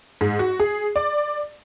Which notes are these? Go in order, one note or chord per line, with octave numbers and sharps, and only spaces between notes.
G#2
F#4
G#4
D5